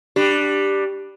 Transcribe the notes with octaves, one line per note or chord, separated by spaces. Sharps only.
G3 D4 G4